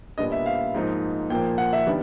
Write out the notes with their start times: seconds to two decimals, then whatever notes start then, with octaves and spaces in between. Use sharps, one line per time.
0.18 A#2 G3 B3 D4 D#5
0.32 E5
0.46 F5
0.75 G#2 F3 A#3 D#4
1.30 A#2 F3 A#3 G5
1.58 F#5
1.73 E5
1.86 D#3 G3 B3 D4